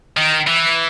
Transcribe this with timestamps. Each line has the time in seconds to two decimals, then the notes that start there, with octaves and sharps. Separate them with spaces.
0.17 D#3
0.47 E3